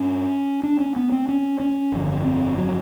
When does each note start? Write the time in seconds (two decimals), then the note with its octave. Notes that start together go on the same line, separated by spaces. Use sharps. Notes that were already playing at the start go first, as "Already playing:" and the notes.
Already playing: G2 C#4
0.63 D4
0.80 C#4
0.96 B3
1.12 C4
1.28 C#4
1.60 C#4
1.92 G1 F2 D3
2.25 C4
2.58 F#3